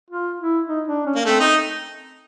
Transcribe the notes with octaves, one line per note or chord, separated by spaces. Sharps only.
F4
E4
D#4
D4
C#4
A#3
A3 C4
D#4